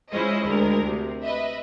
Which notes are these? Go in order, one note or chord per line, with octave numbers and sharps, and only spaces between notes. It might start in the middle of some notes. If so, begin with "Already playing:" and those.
G#3 C#4 E4 F4 C5 D#5
D2 G#3 A#4
C3
B4 D#5 E5